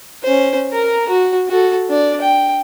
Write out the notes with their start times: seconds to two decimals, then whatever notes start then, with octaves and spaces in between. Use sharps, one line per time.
0.23 C#4 C5
0.73 A#4 A#5
1.09 F#4
1.48 F#4 A4
1.90 D4 D5
2.21 G5